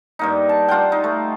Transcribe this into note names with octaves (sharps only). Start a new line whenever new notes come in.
G2 A#3 D#4
A5
D4 F4 F#5 G5
D#4
A3